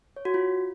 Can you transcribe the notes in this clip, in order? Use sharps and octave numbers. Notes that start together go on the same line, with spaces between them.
C#5
F#4
F4